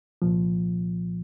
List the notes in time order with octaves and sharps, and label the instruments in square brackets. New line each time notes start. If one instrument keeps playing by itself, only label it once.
[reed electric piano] C2 A#2 F3